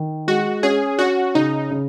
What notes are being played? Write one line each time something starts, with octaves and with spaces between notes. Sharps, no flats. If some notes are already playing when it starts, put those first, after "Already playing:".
Already playing: D#3
G#3 F#4
C#4 G#4
C#4 F#4
C#3 D#4
C#3